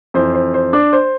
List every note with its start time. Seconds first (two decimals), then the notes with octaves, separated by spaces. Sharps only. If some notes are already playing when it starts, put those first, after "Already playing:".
0.14 F2 E3 C5
0.34 C5
0.54 C5
0.73 D4 D5
0.93 C5